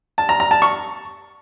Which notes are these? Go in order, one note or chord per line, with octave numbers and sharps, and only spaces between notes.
A5
A#5
A#5
A5
C#6